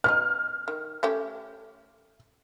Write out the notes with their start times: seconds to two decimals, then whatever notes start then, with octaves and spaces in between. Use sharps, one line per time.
0.04 B3 C#4 D#4 F6
0.68 D#3
1.03 A3 C#4 G4